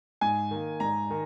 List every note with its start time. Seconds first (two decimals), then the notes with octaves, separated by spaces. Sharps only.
0.21 G#2 G#5
0.51 D#3 A#3
0.80 G#2 A#5
1.10 D#3